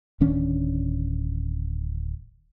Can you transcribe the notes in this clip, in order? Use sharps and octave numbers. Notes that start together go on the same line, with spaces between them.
D1 D#3 C#4 D4